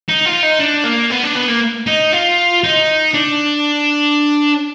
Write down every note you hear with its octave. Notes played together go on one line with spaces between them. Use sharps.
D#4
F4
D#4
D4
A#3
B3
D4
B3
A#3
D#4
F4
D#4
D4